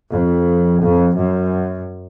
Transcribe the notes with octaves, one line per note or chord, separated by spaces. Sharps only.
F2
F2
F#2